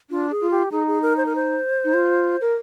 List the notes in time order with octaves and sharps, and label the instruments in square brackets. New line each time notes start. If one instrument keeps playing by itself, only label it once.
[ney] D4 [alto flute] F4
[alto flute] G#4
[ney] F4
[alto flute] G4
[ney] D#4 [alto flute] G#4
[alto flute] G#4
A#4
C5
A#4
C5
[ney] D#4
F4
A#4